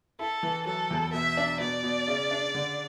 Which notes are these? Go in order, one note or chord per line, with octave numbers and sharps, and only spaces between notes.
E4 A4
E3
F#3 A4
E2
B2 E5
D4
B2 D5
B2
C#3
D4
D3